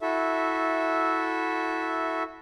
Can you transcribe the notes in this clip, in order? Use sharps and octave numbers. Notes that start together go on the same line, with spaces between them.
E4 F#4 A4 E5